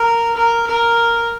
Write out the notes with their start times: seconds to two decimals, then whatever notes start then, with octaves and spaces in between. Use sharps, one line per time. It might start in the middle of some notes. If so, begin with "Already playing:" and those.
Already playing: A#4
0.36 A#4
0.67 A#4